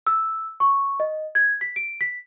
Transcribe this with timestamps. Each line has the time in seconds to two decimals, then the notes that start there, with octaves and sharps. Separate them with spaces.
0.07 E6
0.60 C#6
1.00 D#5
1.35 G#6
1.61 B6
1.76 D7
2.01 B6